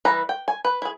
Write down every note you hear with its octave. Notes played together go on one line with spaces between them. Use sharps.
E3 G3 B4 E5 A#5
G5
G#5
B4
E4 G#4